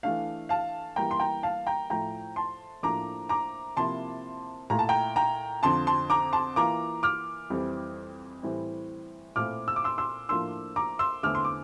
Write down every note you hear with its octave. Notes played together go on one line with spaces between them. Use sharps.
E3 A3 D4 F5
F5 A5
E3 G3 A#3 G5 A#5
C6
G5 A#5
F5 A5
G5 A#5
A2 F3 A3 G5 A#5
A5 C6
A2 F3 A#3 D4 A#5 D6
A#5 D6
C3 F3 A#3 E4 A5 C6
A#2 A3 E4 A#5
A5
G5 A#5
G5 A#5
F2 D3 F3 C4 A5 C6
A5 C6
A#5 D6
A5 C6
E3 A#3 F4 A#5 D6
D6 F6
F2 E3 G3 C4
A2 E3 G3 C4 E4
A#2 A3 C4 E4 D6 F6
E6
D6
C6 E6
C6 E6
A2 F3 A#3 D4 F4 C6 E6
A#5 D6
C6 E6
E2 D3 A3 C4 E4 D6 F6
C6
D6